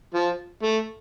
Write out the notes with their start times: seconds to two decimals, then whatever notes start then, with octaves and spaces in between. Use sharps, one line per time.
0.14 F3
0.63 A3